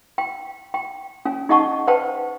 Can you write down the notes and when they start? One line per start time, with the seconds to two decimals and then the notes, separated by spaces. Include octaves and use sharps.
0.18 G5
0.74 G5
1.25 C#4 G#5
1.49 D#4 G#4 D#5 F#5 A5 C#6
1.87 B4 C5 F#5 G5 A5